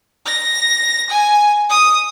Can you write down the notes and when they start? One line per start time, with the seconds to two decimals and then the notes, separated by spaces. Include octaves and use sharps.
0.26 A#6
1.10 G#5
1.69 D#6